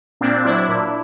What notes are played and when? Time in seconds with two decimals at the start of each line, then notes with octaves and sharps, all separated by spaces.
0.21 A#2 C4 D4
0.45 F#3 D4 E4
0.69 A#2